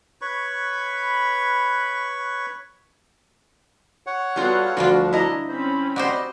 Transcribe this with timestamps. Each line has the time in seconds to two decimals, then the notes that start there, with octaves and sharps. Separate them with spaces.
0.21 B4 C#5 B5 C#6
4.07 C#5 F#5
4.36 G3 B3 F4 F#4 A4 F5
4.77 D2 D3 F3 G3 D4 F4 F#4
5.13 E4 D#5 A#5
5.49 C4 C#4 C5 B5
5.96 F#4 G4 C5 D5 D#5